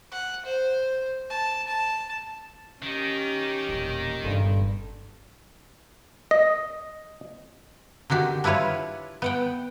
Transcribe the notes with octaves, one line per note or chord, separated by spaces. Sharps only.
F#5
C5
A5
A5
D#3 C#4 D#4 G4
E1 A#2
G1 G2 A#2 D3
D#5
D3 D#3 F#4 G4
D4 E4 F4 B4 C#5
B3 F#5 G5